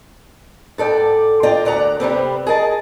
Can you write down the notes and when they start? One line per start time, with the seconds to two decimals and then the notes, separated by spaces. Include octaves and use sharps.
0.78 G#2 A4 D5 G5
1.43 F4 D5 D#5 G5 A#5
1.65 D2 D5 F#5 A#5
2.00 C3 G3 B3 C4
2.47 G#4 A#4 D#5 A5